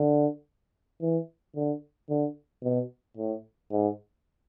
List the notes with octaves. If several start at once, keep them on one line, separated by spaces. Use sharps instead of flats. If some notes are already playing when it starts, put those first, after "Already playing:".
Already playing: D3
E3
D3
D3
B2
A2
G#2